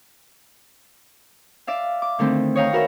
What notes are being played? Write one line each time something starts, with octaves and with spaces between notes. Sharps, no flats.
D5 E5 F5
D6
D3 D#3 A3 C4
C#5 D#5 F5 G5 A#5
F#4 A#4 B4 E5